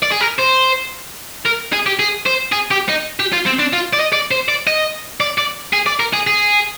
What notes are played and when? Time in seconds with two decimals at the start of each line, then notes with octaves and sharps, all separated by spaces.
0.03 D5
0.12 G#4
0.21 A#4
0.39 C5
1.45 A#4
1.73 G#4
1.86 G4
1.99 G#4
2.26 C5
2.52 G#4
2.71 G4
2.89 D#4
3.20 G4
3.33 F4
3.46 C4
3.59 D4
3.73 F4
3.93 D5
4.00 D#5
4.13 D5
4.31 C5
4.48 D5
4.67 D#5
5.20 D5
5.38 D5
5.73 G#4
5.87 D5
6.00 A#4
6.13 G#4
6.27 G#4